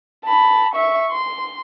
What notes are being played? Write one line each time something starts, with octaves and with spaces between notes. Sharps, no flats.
A5 B5
E5 C#6
C6